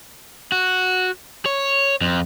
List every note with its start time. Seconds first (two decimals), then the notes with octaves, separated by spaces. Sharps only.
0.52 F#4
1.46 C#5
2.01 F2